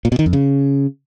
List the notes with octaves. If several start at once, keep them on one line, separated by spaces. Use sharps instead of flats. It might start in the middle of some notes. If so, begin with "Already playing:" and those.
A#2
B2
D#3
F2
C#3